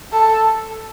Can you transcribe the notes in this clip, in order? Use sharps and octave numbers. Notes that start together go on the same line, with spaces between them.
A4